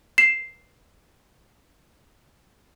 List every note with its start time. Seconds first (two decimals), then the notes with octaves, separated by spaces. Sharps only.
0.18 C7 E7